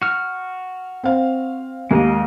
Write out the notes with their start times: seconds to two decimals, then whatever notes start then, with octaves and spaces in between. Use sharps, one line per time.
0.02 F#4 F6
1.04 C4 F5
1.91 D#2 G#3 A#3 D#5